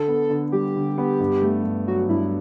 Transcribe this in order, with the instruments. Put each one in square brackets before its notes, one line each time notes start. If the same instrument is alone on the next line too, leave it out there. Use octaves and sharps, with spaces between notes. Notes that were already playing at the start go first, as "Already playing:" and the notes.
Already playing: [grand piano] D3 [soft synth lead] A4
[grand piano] B3
D3
[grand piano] G3 [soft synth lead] G4
[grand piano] D3
B3
G2
A3
G2
[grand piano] F#3 [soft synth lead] F#4
[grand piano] G2 [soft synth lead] E4